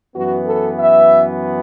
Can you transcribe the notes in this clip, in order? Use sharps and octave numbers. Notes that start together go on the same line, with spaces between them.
F#2 E3 B3 F#4
A4
E5